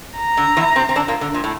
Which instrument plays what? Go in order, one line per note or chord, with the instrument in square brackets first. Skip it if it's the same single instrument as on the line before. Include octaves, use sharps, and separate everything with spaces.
[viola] A#5
[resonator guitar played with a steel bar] D3
E2 E3
C3 C4
C4
D3 D4
A#2 A#3
D3
A#2
A2